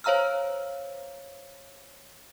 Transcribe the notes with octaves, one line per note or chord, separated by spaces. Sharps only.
C5 C#5 F5 A#5 E6 F6